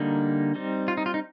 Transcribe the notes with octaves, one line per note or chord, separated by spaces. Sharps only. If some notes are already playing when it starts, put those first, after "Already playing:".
Already playing: D3 G3 A#3 D#4
G3 C4 D#4
F4
D#4
F4
D#4